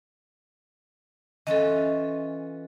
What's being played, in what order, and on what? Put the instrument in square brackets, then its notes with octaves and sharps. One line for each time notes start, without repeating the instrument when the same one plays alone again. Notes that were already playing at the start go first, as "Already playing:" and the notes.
[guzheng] E3 C#4 F4 [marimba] A4 D#5